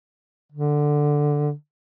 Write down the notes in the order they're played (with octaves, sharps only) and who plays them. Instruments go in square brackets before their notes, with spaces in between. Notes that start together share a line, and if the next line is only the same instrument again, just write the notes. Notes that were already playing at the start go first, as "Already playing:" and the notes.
[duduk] D3